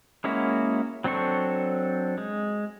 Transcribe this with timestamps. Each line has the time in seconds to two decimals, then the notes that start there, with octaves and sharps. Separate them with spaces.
0.24 G#3 A#3 C#4 E4 F#4
1.04 F#3 C4 D4 A4 C#6
2.18 G#3